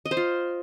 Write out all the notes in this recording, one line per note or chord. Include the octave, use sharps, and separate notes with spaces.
D#5
C5
F4